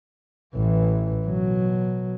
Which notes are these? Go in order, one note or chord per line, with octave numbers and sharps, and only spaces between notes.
A1 E3
B2 F#3